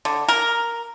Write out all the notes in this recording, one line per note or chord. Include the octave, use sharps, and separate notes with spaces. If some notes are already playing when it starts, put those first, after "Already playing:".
D3
A#4